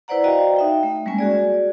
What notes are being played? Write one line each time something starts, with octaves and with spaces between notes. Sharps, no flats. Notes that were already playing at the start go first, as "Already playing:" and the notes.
E4 B4 C5 D5 F#5 A#5
F#4 D5 D#5 F5 G5 A#5
D#4 E5 G5
A3
G3 G#3 A#3 C#4 G#5
F#4 G#4 D5